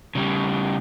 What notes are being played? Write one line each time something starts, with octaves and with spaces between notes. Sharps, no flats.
C#3 G3